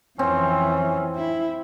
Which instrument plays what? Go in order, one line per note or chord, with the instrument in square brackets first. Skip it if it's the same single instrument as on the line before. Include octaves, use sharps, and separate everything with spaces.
[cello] F2 E3 [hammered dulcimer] C4 [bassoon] C#4
[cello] E4